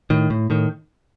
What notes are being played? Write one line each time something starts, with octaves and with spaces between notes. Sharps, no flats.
A2 D#3
A2
A2 D#3